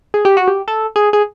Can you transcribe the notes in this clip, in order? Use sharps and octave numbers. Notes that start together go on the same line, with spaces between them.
G#4
G4
F#4
G4
A4
G#4
G#4